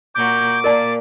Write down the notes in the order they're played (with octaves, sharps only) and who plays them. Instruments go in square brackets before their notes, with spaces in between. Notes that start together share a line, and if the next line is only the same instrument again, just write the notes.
[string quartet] A#2 F#4 A#4 [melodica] D6 [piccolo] G6
[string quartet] A#2 A#3 [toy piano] A#4 D5 A5 [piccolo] A6